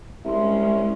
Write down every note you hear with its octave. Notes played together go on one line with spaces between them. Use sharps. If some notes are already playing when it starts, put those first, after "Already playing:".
C2 G#3 C#4 E5 C6